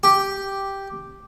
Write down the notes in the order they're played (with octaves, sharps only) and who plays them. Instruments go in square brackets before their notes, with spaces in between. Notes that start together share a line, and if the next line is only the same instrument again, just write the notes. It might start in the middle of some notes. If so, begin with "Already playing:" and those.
[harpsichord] G4